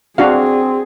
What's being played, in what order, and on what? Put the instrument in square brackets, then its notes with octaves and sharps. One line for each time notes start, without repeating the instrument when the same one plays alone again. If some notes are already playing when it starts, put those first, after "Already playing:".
[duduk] C4 [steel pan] D4 F#4 F5 [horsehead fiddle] G#4